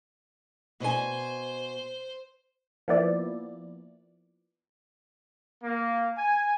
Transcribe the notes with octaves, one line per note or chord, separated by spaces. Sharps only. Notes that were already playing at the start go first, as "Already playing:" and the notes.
B2 C5 G#5
F3 A#3 B3 E4 D5
A#3
G#5